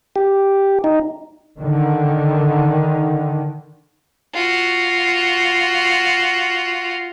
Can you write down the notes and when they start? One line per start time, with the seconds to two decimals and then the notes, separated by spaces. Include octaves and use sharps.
0.16 G4
0.84 D#4
1.58 D3 D#3
4.34 F4 F#4